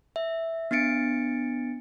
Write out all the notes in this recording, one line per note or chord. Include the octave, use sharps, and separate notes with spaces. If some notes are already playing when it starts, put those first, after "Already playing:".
E5
B3 D4 A6 C#7 D7